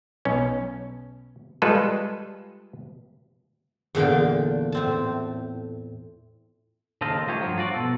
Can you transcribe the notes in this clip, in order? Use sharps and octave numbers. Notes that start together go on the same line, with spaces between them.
B1 C#4
G3 G#3 F4 A4 B4
E2 A#2 D3 F5 G5
A2 C4 A5
D#2 C#3 A4 C5 D#5 F5
A3 F4 G4 C5 C#5
G2 F3 F#3
F4 F#4 D5
B2 A4